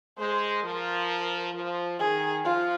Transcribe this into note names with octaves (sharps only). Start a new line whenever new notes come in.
G#3 C5
F3 A#4
F3
D#3 G#4
F3 F4